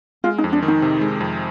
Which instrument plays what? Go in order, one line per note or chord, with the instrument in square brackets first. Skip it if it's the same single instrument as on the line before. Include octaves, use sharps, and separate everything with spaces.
[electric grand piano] G#3 [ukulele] F4
[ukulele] D#4
[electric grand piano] F2
[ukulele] D4
[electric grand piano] D#3
[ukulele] D#4
[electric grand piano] C3
G#3
F2